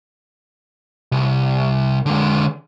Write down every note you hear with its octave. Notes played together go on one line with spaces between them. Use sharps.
C2
D3 G#3